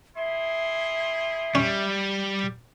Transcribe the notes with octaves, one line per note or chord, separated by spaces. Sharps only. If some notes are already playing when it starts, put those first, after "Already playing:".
E4 G#4 E5 C6
G3 C#4